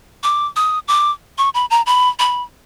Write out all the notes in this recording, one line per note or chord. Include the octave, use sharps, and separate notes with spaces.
D6
D#6
D6
C#6
B5
A#5
B5
B5